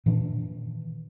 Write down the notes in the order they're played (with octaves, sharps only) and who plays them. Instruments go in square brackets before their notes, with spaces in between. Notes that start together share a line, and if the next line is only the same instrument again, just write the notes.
[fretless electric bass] A#2 D#3 E3 D4